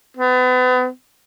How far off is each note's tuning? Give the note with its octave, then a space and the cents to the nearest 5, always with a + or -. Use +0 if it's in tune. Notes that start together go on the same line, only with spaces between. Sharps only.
B3 +35